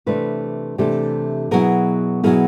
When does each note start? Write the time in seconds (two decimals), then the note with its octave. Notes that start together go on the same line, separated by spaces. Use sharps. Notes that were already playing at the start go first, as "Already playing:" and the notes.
0.06 C3 E3 A3 D4 A4 B4
0.78 C3 E3 A3 D4 G4 A4
1.51 B2 F#3 B3 E4 G#4 A#4
2.23 B2 F#3 B3 E4 G#4 A#4